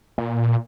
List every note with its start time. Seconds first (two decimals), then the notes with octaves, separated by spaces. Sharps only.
0.18 A#2